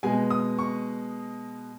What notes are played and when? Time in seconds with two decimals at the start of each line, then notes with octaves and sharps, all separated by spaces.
0.03 B2 G#3 B3 G#5
0.30 D#6
0.59 C#6